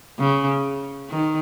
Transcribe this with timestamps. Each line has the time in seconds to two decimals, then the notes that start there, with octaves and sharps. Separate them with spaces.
0.19 C#3
1.10 D#3